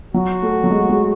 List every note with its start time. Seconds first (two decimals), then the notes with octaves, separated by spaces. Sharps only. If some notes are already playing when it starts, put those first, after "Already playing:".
0.14 F#3 F#4
0.42 A3
0.64 F#3
0.71 G#3
0.89 G#3